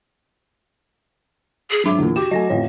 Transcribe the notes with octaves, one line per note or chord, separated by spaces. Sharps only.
G#4
G#1 F#3 D4 E5 D6
E2 A#2
F#4 G4 D6 E7
F#3 A3 D#5 G#5 A#6
A1 F2 A2 C#5